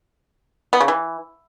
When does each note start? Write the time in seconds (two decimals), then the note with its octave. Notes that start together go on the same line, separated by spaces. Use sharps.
0.73 B3
0.80 C#3
0.88 E3